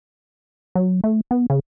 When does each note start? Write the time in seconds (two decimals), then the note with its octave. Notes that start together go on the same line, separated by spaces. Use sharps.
0.75 F#3
1.04 A3
1.31 B3
1.50 C#3